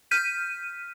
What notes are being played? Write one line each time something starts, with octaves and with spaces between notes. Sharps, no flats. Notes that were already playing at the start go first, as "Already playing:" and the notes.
F6 G6 B6 D#7